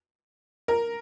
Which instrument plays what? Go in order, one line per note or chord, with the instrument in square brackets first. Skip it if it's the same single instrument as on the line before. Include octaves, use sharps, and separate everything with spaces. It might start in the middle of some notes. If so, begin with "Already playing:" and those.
[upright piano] A#4